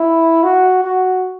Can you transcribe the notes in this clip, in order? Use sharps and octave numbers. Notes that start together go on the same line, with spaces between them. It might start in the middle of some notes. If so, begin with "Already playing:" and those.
Already playing: E4
F#4
F#4